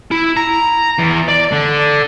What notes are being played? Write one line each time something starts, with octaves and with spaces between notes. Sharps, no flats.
E4
A#5
E2
D5
D3